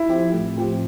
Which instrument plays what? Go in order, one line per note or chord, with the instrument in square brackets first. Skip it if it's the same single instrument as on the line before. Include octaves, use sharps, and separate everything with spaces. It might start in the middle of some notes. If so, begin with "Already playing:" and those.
Already playing: [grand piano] E4
[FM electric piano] F3 C4 G4
A2
F3 C4 G4